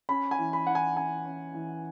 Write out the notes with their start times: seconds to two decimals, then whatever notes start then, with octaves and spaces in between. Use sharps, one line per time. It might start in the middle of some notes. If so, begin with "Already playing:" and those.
0.09 C#4 B5
0.31 G#5
0.39 E3
0.53 B5
0.67 E3 F#5
0.75 G#5
0.96 C#4 G#5
1.25 C#4
1.55 E3